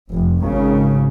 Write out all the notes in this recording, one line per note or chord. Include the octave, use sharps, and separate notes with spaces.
F1
G#1 C#3